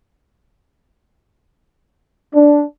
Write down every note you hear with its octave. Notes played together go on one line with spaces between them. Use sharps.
D4